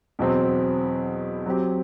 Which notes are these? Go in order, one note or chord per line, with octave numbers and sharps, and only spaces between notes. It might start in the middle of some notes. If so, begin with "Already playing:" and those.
E2 B2 F#3 C4
F#3 C4 G4